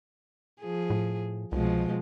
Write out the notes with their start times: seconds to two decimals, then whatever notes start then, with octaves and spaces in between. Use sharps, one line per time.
0.61 F3 G#4
0.90 A2
1.52 C2 B2 F3 G#3